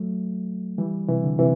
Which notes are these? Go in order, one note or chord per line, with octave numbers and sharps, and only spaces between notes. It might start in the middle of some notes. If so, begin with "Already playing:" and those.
Already playing: F#3 A3
E3 G3
C3 E3
D3
C3 E3